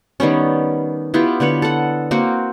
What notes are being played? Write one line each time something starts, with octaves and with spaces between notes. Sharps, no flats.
D#3 G3 B3 C#4
B3 E4 F4 G4
D3 B3 B4 C#5
A4 F#5
A#3 C4 F#4